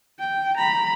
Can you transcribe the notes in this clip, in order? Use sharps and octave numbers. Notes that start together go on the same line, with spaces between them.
G5
A#5 B5